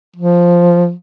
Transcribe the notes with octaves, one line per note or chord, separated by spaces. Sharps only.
F3